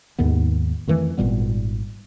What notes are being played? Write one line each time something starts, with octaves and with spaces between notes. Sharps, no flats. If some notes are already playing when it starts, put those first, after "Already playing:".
D#2 G#2 D#3 B3
F2 D#3 E3 A3
G#1 A#2 G3 B3